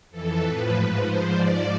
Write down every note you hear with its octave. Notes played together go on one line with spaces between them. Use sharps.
F2 E3 A4
A2 F3 B4
G#2 F3
G#2 F3 C5
G#2 F3 D5